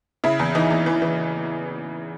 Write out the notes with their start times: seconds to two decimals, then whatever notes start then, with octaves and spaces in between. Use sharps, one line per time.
0.24 C#3 E4
0.39 E2
0.55 E3 D#4
0.70 E2
0.86 E3
1.02 E3